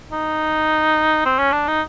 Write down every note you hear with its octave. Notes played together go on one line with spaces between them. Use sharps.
D#4
C4
C#4
D4
D#4